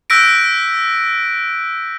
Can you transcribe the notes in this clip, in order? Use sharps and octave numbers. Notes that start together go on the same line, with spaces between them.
E6 F#6 G6 A#6 B6 D7